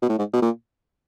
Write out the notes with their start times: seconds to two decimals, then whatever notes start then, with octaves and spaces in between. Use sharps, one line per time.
0.02 B2
0.09 A2
0.19 G#2
0.33 B2
0.42 A#2